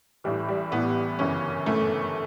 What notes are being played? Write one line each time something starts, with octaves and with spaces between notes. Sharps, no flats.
A1 A2 E3 G3
G3
A1 A2 E3 B3
G1 F#2 C#3 E3 C#4
G1 F#2 C#3 E3 A3